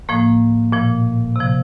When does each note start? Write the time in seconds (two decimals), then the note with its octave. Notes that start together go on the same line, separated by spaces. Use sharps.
0.09 A2 F3 A#3
0.72 A#2 F3
1.36 C3 F3